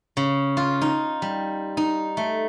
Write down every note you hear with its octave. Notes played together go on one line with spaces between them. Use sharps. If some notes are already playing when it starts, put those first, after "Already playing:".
C#3
F4
D#4
G3
D#4
A3